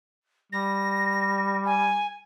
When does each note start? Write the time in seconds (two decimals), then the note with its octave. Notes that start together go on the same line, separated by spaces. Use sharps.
0.52 G3 A#6
1.65 G#5